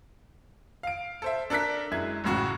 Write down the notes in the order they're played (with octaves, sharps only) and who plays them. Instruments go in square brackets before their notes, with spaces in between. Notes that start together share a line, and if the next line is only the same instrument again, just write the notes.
[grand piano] F5 D7
A4 C5 E5
D4 A4 A#4 F#6 B6
F#2 G#3 E4 G#6
A1 F#2 A2 C#3 F#4 C#6